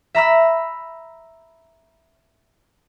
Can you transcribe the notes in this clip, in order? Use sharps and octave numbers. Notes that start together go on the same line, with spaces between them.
E5 A#5 B5 E6